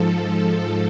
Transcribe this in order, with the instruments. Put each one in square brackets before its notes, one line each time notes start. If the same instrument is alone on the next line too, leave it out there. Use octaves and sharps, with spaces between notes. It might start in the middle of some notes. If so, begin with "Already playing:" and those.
Already playing: [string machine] G#2 F3 A4
A4